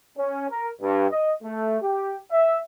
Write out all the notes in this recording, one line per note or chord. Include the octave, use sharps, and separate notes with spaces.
C#4
A#4
G2
D#5
A3
G4
E5